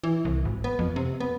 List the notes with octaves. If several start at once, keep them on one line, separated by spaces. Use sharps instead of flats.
E3
C2
G#1
B3
F2
C3
B3